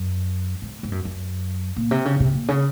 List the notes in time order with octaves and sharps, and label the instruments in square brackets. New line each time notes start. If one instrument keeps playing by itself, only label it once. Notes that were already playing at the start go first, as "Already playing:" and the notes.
Already playing: [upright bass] F#2
G#2
G#2
F#2
F#2
A#2
C3
C#3
C3
A#2
C#3